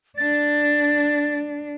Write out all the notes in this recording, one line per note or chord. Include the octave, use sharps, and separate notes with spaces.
D4 A6